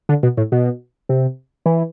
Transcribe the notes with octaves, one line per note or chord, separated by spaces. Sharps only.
D3
B2
A2
B2
C3
E3